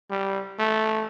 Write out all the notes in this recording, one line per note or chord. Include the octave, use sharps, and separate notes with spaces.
G3
A3